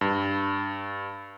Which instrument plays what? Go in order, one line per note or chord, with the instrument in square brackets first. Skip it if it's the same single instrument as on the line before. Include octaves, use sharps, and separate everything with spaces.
[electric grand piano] G2